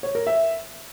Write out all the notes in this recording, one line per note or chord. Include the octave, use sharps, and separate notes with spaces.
C#5
A#4
E5